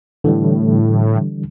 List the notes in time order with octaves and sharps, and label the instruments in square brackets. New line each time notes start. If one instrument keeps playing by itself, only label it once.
[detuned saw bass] A2 [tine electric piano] D3 E3 G3